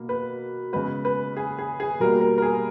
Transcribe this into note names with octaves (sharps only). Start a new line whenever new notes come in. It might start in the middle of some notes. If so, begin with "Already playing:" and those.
Already playing: B2 A#3
B4
C#3 G#3 B3 B4
B4
G#4
G#4
G#4
B2 G3 A#3 A#4
A#4
A#4
G#4